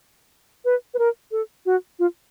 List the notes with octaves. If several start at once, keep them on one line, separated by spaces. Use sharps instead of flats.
B4
B4
A#4
A4
F#4
F4